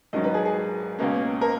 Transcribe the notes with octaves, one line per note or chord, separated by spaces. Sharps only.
G#1 G#2 D#3 F#3 D#5
B4
G#4
G#4
C#2 B2 A#3 C#4
A#4